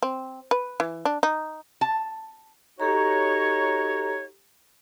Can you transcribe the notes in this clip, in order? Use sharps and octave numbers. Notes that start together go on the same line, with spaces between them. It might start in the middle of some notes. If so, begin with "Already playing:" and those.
C4
B4
E3
D4
D#4
A5
D#4 F#4 G4 A4 C#5 A#5